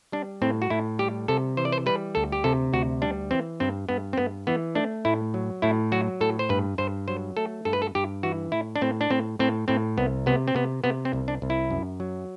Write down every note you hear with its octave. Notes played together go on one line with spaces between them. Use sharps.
G3 D4
A2 C4
F#4
A2 E4
G3 G4
C3 A4
E3 C5
D5
C5
G3 B4
D2 A4
G4
C3 A4
D2 F#4
G3 D4
E3 C4
G2 C4
G2 B3
C4
G2 B3
E3 B3
A3 D4
A2 E4
F#3
A2 E4
F#3 F#4
A2 A4
C5
G2 B4
G2 C5
F#3 C5
A3 A4
G2 A4
B4
A4
G2 G4
E3 F#4
A2 E4
D4
A2 C4
D4
A2 C4
A2 C4
A2 C4
C2 B3
C3 B3
C4
C3 B3
C3 B3
C4
C2
D4
C2
E4
F#2
F#3